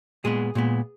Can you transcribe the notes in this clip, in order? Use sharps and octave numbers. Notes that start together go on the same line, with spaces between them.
A#2 G#3 B3 G#4
A#2 G#3 B3